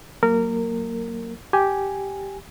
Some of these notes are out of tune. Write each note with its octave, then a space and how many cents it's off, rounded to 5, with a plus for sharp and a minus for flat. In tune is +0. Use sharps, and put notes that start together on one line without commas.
F#3 +0 A#3 -10 A#4 -20
G4 -5 G#5 +0